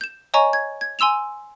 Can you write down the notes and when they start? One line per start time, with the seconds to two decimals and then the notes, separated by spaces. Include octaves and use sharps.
0.01 G6 E7
0.34 C#5 D#5 G#5 A#5 C#6
0.53 G#6
0.81 G#6
0.99 G#5 C6 E6 E7 F7